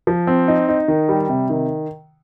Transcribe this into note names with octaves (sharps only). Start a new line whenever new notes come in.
F3
C4
D#4
D#4
D#3
G3
C3
D#3